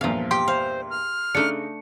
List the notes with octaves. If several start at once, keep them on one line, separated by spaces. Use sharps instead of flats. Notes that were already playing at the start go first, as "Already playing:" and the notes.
E2 G2 A#2 F3 F5
G4 G5 C6
C5 F5
F6
C#3 A3 D4 D#4 C#7